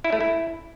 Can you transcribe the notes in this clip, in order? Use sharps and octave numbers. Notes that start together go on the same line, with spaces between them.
E4
A3
E4